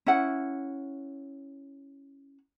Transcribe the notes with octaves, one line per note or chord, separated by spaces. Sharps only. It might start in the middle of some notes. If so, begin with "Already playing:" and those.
C#4 E4 F#5